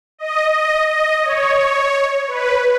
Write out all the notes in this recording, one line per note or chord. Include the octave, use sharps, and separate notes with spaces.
D#5
D#5
D#5
C#5
B4